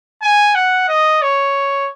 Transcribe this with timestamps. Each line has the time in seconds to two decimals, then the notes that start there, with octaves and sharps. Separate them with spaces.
0.22 G#5
0.55 F#5
0.88 D#5
1.22 C#5